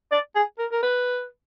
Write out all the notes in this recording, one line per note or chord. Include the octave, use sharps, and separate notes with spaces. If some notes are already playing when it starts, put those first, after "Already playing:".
D5
G#4
A#4
A#4
B4